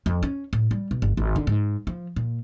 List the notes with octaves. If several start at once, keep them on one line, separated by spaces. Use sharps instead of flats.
F2
C#4
A2
G3
B2
G1
G#1
D3
G#2
F3
A#2